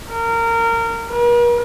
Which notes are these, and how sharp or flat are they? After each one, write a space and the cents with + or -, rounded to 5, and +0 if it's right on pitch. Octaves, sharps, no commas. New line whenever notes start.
A#4 -20
A#4 +45